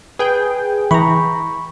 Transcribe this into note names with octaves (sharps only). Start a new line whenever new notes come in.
G#4 B4 G5
E3 A#5 B5 C#6